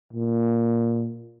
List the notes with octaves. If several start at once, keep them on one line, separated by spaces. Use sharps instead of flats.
A#2